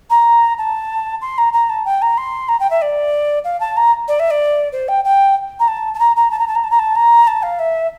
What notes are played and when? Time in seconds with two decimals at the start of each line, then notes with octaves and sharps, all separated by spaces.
0.10 A#5
0.58 A5
1.21 C6
1.38 A#5
1.53 A#5
1.69 A5
1.85 G5
2.02 A#5
2.17 C6
2.48 A#5
2.60 G5
2.70 E5
2.81 D5
3.44 F5
3.60 A5
3.76 A#5
4.08 D5
4.19 E5
4.30 D5
4.72 C5
4.88 G5
5.04 G5
5.59 A#5
5.68 A5
5.94 A5
5.99 A#5
6.16 A#5
6.31 A5
6.39 A#5
6.47 A5
6.55 A#5
6.64 A5
6.71 A#5
6.79 A5
6.95 A#5
7.27 A5
7.42 F5
7.59 E5